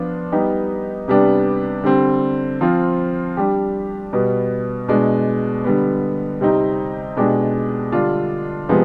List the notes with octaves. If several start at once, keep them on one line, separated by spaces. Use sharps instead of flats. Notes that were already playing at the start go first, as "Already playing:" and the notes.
Already playing: F3 B3 D4 F4
G3 B3 D#4 G4
C3 G3 B3 D4 G4
D3 G3 C4
F3 C4 F4
G3 D4 G4
B2 G3 B3
B2 G#3 D4
D3 G3 B3
C3 G3 C4 D#4
B2 G#3 D4 G4
D3 G3 D4 F4
C3 F3 G#3 B3